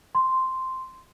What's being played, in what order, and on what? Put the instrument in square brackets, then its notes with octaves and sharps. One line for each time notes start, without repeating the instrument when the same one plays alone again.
[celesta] C6